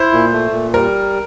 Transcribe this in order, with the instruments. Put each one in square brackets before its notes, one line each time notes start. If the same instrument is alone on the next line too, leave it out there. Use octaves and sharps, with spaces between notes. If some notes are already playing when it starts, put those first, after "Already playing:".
Already playing: [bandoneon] E4 [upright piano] C5
[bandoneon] A#2
A3
A#2
[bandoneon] G3 [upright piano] A#4